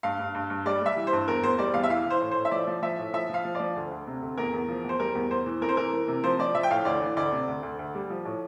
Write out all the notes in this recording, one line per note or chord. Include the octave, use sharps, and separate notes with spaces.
G2 F5
G2
G2
G2
G3 D5
G3 E5
E3
C5
G2
E2 A#4
E2 C5
G3 D5
E2 F5
E5
E3 F5
E3 C5
A2
A2 C5
E5
F3 D5
F3
F3 E5
A2
F3 E5
F3 F5
F3
F3 D5
D2
D2
C3
D2
E2 A#4
E2
F3
E2 C5
G3 A#4
E2
E2 C5
E3
F2 A#4
C5
E3 A#4
E3
C3
F3 C5
F3 D5
F3 E5
G5
A2 F5
D2 D5
E3
D2 D5
C3
D2
D2
D2
G3
F3
A2